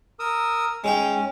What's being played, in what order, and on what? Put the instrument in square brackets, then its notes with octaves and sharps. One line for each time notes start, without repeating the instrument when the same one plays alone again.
[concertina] A#4 D#6 E6
[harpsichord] G#3 D#4 G5 [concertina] C#4